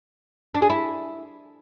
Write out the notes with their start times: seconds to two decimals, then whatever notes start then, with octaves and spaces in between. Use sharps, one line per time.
0.55 D4
0.62 G#4
0.70 E4